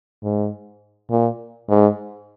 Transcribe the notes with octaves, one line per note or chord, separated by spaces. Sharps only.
G#2
A#2
G#2